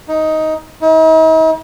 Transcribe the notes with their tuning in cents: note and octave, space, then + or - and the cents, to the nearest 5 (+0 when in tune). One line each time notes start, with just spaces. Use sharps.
D#4 +10
D#4 +45